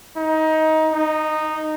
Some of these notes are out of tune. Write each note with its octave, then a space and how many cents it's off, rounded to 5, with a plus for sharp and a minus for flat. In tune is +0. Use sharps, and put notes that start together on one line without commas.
D#4 +20
D#4 -10